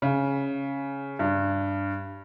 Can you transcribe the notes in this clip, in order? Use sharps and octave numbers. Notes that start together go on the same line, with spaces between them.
C#3
G2